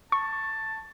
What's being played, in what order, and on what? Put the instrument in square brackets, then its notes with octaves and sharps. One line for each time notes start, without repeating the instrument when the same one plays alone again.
[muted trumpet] A5 [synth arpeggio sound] C#6